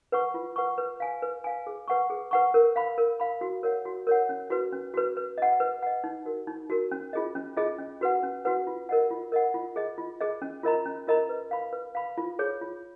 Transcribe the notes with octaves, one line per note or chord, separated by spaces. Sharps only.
B4 F#5 C#6
F4
B4 F#5 C#6
B4
F5 G#5
B4
F5 G#5
G#4
B4 F#5 C#6
G#4
B4 F#5 C#6
A#4
F5 B5
A#4
F5 B5
F#4
A#4 C#5 F#5
F#4
A#4 C#5 F#5
C#4
F#4 B4
C#4
F#4 B4
B4
D#5 F#5
B4
D#5 F#5
D#4
F#4 A#4
D#4
F#4 A#4
C#4
F4 G#4 D#5
C#4
F4 G#4 D#5
C#4
F#4 B4 F#5
C#4
F#4 B4 F#5
F4
A#4 D#5 F#5
F4
A#4 D#5 F#5
F4
G#4 D#5
F4
G#4 D#5
C#4
F4 A#4 D#5 A#5
C#4
F4 A#4 D#5 A#5
B4
F5 B5
B4
F5 B5
F4
G#4 C#5
F4